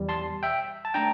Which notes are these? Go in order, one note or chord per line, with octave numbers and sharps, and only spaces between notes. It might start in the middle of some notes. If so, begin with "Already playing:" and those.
Already playing: E2 E3 G3
A5 C6
E5 G5
A5
A3 D4 G5 A#5